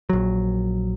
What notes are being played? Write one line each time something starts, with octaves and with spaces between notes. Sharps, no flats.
A#1 F#3